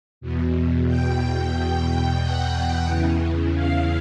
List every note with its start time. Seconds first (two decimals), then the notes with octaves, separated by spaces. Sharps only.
0.21 E2 B2
0.87 G5
2.21 F#5
2.86 E2 C#3 E3
3.54 F5